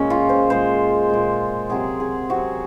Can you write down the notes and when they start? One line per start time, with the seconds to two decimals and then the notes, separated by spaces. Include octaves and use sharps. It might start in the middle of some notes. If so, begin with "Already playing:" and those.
Already playing: A#2 G#3 C#4
0.10 F4
0.29 C5
0.50 A#2 G#3 C5
1.09 A#2 G#3
1.69 C3 F#3 G#4
2.00 G#4
2.29 C3 F#3 F#4